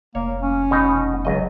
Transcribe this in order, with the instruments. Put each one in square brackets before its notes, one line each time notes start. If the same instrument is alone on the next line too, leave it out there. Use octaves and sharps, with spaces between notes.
[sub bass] F1 [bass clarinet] A#3 [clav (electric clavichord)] C#5
[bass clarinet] C#4
[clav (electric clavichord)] B2 D#4
[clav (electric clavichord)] C#2 D#5 [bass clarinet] F#3